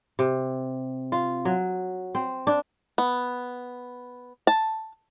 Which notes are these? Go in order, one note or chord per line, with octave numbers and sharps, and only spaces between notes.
C3
F4
F#3
C4
D4
B3
A5